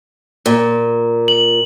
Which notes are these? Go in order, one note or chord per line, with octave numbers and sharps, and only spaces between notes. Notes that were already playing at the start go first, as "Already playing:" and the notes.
A#2
F#7